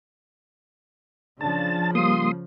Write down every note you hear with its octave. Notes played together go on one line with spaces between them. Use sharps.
C#3 F3 D4 A5
G3 A#3 F4 C6 D#6